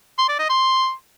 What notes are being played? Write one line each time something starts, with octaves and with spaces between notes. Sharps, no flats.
C6
D5
D#5
C6